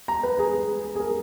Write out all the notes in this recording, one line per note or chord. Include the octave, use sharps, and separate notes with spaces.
A#5
B4
G#4
G#4
A#4